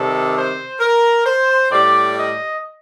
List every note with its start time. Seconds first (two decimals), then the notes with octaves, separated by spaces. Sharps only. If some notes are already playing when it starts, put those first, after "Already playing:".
Already playing: C3 D#3 G3 A4
0.35 C5
0.80 A#4
1.25 C5
1.71 A2 G3 D5
2.17 D#5